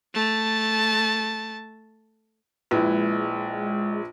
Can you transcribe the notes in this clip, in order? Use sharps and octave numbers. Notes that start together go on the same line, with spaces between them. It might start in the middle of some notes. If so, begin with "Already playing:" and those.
A3 A5
A#1 G#3 E4 B4